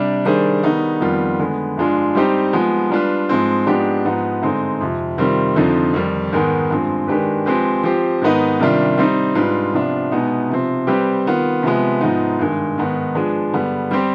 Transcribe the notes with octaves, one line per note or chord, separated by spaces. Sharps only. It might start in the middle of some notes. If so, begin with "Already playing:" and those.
Already playing: C3 G3 D4
D#3 G3 D4 G#4 C5
D#3 G3 B3 D#4
F2 D#3 G3 B3 F4
D3 G#3 B3
G2 F3 G#3 D4 F4
G3 C4 D#4 G4 C5
F3 G#3 B3
G3 D4 F4 B4
G#2 F3 G#3 C4
G#2 F3 B3 D4 G4
G#2 F3 B3 D#4
G2 D3 G#3 C4 D#4
F2 C3 F3
C3 D#3 G3 C4 F4
F2 D3 F3 C4 D#4
F2 D#3 G3
G#2 D#3 G#3 B3
G2 F3 G#3 C4
D#3 G#3 D4 G4 B4
F3 G#3 C4 G4 B4
F3 C4 G4 C5
G#2 D#3 B3 D#4 B4
C3 D#3 G3 D4 F4
G3 C4 D#4
G#2 G3 D4 F4 B4
C3 F3 B3 D4 F4
B2 G#3 B3 D#4
C3 F3 C4
G3 C4 G4 B4
D#3 B3 F4
C3 F3 G#3 B3
G#2 F3 B3 D#4
G2 D#3 G#3
G#2 D#3 B3
F3 G#3 D4 G#4 B4
G2 D3 G3 B3
G3 C4 G4